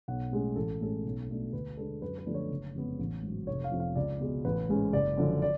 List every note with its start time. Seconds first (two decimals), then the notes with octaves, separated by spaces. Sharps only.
0.08 B1 F#5
0.32 A2 G#3 C#4
0.56 A1 A4
0.81 A2 G#3 C#4 A4
1.05 B1
1.29 B2 A3 D4
1.53 D2 B4
1.77 D3 G#3 D4 A4
2.02 F#2 B4
2.18 B4
2.26 D3 F3 A3 D4
2.34 C#5
2.50 F#1
2.75 F2 C#3 G#3 B3
2.99 A1
3.23 G#2 F#3
3.47 F1 C#5
3.64 F5
3.72 F2 F3
3.80 F5
3.96 C#2 D5
4.20 B2 G#3
4.45 A1 B4
4.69 G#2 G#3 C#4
4.93 F#1 D5
5.17 F#2 D3 F3
5.42 D5